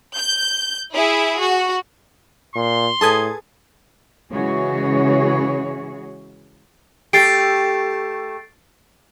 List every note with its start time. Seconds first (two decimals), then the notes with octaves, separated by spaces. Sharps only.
0.16 G6
0.93 E4 G#4
1.38 F#4
2.56 A#2 C6
3.01 A2 G#4 A4 B4 A5 D#6 G#6
4.31 C#3 E3 G#3 F#4 G#4 C#5
7.13 A3 G4 A6 C7 D7